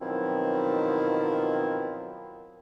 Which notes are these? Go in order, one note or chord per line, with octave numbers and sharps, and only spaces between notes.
B2 D#3 F3 F#3 C4 E4